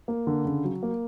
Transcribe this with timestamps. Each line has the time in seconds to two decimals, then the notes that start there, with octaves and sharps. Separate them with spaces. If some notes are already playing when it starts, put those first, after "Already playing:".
0.08 A#3
0.27 D3
0.45 C#3
0.64 F#3
0.83 A#3